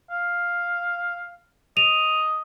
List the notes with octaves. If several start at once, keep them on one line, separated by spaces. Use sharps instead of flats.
F5
D#5 D#7 F7